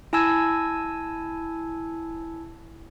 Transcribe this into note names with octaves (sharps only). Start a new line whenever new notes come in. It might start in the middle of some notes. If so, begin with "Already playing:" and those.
E4 G#5 A5 E6 G#6